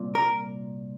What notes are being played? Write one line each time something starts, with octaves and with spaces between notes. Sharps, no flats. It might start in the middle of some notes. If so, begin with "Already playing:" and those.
Already playing: C2 A#2
A#4